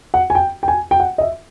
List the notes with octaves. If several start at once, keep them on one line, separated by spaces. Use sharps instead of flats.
F#5
G#5
G5
G5
G#5
G5
F#5
D#5
E5